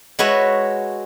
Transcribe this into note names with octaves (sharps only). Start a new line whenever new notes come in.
G#3 F#4 B4 C#5 E5